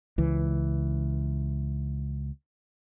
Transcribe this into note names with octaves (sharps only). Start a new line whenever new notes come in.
C#2 E3